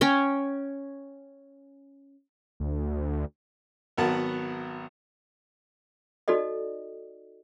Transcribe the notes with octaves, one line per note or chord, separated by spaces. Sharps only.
C#4 C#5 G5
D2
G#1 F#3 B3 A#4 F#5 A5
D#4 F#4 A4 D5 D#5